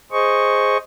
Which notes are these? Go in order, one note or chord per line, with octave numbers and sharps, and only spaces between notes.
G#4 C5 D#5 C#6